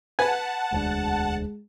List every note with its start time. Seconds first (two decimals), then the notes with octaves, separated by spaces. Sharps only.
0.19 B4 F#5 G#5 A5
0.72 E1 D2 G#3 D4